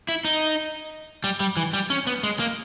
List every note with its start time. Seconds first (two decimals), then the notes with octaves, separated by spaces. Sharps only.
0.08 E4
0.25 D#4
1.24 G3
1.40 G3
1.57 E3
1.73 G3
1.90 C#4
2.07 B3
2.23 G#3
2.39 A#3